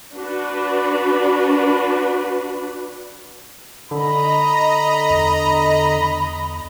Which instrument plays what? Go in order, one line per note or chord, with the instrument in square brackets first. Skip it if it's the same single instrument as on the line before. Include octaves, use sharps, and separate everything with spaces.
[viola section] D4 F#4 B4
[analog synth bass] D3 [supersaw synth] D#5 A#5 [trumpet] B5
[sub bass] E2